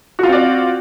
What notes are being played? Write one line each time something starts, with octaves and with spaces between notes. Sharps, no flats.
C4 F4 F#4 D5